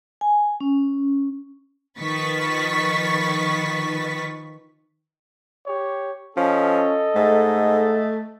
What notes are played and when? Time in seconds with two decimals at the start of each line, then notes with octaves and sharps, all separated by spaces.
0.21 G#5
0.61 C#4
1.99 D#3 F3 B4 C#6 A6 B6
5.66 G4 C#5
6.37 F3 C#4 A4 D#5
7.15 G#2 A3